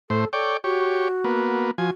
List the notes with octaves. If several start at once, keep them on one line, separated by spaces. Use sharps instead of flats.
A2 A4 C5
A4 C#5 D5 G5
F#4 G4 C#5
A#3 B3
F3 F#4 G#5